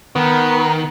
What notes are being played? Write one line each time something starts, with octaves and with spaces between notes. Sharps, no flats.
D#3 B3